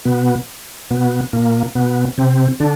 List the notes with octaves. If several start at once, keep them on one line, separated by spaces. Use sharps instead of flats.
B2 B3
B2 B3
A#2 A#3
B2 B3
C3 C4
D3 D4